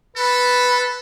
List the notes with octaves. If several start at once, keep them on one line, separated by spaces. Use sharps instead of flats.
A4 B4